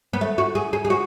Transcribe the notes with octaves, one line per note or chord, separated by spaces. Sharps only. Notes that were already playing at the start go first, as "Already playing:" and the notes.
B3
A3
F#4
G#4
G#4
G#4
F#4